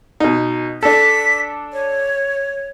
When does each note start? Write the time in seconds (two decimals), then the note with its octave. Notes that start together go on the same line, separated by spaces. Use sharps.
0.20 B2 D#4
0.83 D4 A4 B6
1.73 C#5